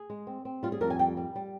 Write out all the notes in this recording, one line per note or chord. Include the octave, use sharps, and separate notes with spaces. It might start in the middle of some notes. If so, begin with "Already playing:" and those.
Already playing: G#4
G#3
C4
C4
G3 F4
G#4
F2 A#4
G#5
G3 G5
G3
G3